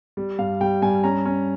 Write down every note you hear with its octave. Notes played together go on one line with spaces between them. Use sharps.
G3
G2 F5
G3 G5
G2 G#5
C#4 A#5
C#4